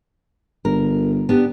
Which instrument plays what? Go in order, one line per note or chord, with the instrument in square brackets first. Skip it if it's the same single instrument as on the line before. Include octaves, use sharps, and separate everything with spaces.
[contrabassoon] G1 [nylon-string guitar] A#4
[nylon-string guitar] B3 D4 G4